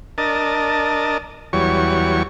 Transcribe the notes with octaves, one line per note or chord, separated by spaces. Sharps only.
D4 A#4 D#5 A5
E2 F#3 G3 C#5 C#6